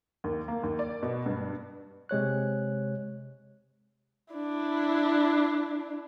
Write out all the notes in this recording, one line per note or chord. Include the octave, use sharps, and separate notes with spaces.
D#2
A#3
D#2
D5
B2
G2
C3 G#3 C#5 F#6
D4 E4